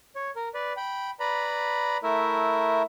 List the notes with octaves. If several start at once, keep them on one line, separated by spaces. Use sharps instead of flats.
C#5
A#4
B4 D5
G5 B5
B4 D5 A#5 B5
A3 E4 A#4 E5